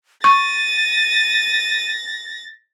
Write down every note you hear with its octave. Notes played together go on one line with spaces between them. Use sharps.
C#6 A6 A#6 D#7